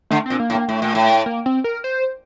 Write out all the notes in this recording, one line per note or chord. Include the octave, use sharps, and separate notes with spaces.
D3 A3
A#2 C4
A#3
A2
A#3
A2 A3
A#2
A2
A#3
C4
A#4
C5